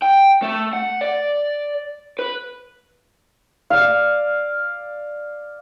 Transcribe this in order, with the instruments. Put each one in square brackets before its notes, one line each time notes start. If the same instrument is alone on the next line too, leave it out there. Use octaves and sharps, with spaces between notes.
[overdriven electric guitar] G5
A3
F#5
D5
B4
[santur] D5 F5